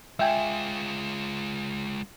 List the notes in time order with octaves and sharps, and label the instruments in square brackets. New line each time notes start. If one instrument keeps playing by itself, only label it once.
[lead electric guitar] G#3 F4 [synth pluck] E5 G5 G#5